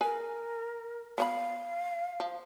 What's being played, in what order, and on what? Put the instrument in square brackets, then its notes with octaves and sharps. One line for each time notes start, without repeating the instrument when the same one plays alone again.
[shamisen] G#4 B4 G#5 [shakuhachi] A#4
[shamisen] B3 C5 B5 [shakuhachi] F5
[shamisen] F3